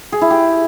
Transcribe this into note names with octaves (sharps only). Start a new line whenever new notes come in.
G#4
E4
G4